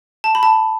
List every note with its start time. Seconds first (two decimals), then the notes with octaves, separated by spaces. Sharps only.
0.24 A5
0.35 B5
0.43 A5